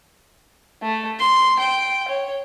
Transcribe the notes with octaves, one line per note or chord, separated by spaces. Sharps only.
A3
C6
G5
C#5